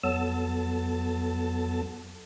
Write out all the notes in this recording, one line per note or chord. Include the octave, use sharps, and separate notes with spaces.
F2 F#3 B3 A4 A5